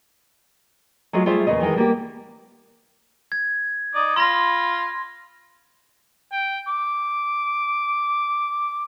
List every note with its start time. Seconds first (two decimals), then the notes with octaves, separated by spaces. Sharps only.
1.13 F#3 G#3 A3 F4 F#4
1.26 G3 A3 F4 G#4 C5 E5
1.47 E2 A#2 C#3 D#5
1.60 D#3 E3 G#3 A#4
1.76 G3 A#3 B3 G4
3.32 G#6
3.95 D#4 D5
4.16 F4 B5 C6 A#6
6.33 G5
6.68 D6